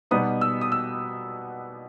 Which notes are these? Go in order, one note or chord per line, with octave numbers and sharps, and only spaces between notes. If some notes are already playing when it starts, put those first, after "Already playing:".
B2 G3 B3 D#4 D#6
E6
D#6
E6